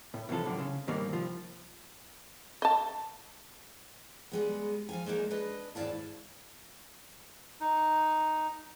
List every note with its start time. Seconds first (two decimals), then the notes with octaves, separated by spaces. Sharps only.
0.14 A2
0.29 A2 C3 E3 F3 A4
0.46 F#2 A2 D3
0.59 C#3
0.88 D#2 G#2 D#3 G3 A#3
1.09 C2 F3
2.62 D#5 A5
4.32 G3 G#3 B3
4.89 F3 F5 G#5
5.06 G#3 A#3 D4 D#4 A#4
5.31 D4 B4 D#5
5.75 D#2 G#2 E4 D5 F5 A5
7.61 D#4